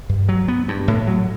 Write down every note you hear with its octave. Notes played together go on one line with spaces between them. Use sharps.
G2
F#3
B3
G2
A2
F#3